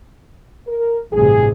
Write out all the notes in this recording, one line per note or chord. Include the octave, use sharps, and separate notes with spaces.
A#4
A1 G2 C3 G#4